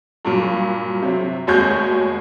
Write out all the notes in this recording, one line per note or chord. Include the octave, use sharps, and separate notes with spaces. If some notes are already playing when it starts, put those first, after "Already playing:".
G2 A#2 F#3
C3 F#3
F1 D#2 G#3 F#4 C#5 G6